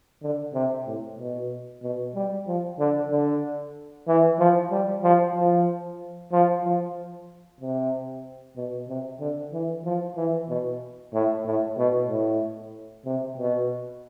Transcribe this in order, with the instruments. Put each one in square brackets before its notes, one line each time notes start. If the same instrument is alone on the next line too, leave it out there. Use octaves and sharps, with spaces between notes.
[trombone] D3
C3
A2
B2
B2
G3
F3
D3
D3
E3
F3
G3
F3
F3
F3
F3
C3
B2
C3
D3
E3
F3
E3
B2
A2
A2
B2
A2
C3
B2